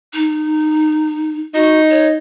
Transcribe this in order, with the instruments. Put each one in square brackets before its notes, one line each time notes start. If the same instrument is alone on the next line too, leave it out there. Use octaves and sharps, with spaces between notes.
[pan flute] D#4
[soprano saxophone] D#4 [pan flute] F#4
[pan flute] C#5